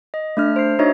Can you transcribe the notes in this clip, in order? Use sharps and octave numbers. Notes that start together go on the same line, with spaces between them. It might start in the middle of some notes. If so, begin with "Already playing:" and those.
D#5
A3 D4 F6
C5 C7
D4 D#4 F#4 C#5 D#5 E5